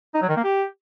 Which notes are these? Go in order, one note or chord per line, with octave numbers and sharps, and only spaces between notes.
D#4
F#3
D#3
A#3
G4